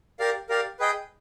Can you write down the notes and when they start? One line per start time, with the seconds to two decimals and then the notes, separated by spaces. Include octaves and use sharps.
0.19 G4 A#4 D5 F5
0.49 G4 A#4 D5 F5
0.80 G#4 B4 D#5 G5